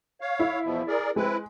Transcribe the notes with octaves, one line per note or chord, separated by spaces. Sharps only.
C#5 F5
E4
E2 B2 F3
G#4 A#4 D5
G#3 C4 E4 B4